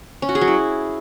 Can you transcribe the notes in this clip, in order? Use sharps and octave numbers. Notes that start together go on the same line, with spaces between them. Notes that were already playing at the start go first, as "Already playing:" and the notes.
C#4
F#4
G#4
F#3
E4